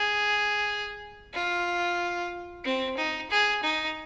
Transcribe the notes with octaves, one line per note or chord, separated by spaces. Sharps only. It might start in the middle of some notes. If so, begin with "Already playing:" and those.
Already playing: G#4
F4
C4
D#4
G#4
D#4